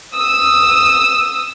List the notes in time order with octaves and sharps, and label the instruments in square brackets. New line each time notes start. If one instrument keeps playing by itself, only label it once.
[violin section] D#6 E6